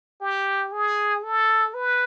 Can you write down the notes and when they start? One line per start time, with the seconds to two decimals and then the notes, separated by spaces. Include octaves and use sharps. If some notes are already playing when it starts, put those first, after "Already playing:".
0.21 G4
0.72 G#4
1.23 A4
1.74 B4